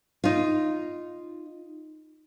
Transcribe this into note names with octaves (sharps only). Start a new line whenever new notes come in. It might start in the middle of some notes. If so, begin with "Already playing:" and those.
D#4 F4